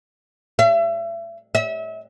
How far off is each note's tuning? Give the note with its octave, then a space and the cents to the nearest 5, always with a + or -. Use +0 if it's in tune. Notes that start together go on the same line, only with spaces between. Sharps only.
E5 +35
E5 -30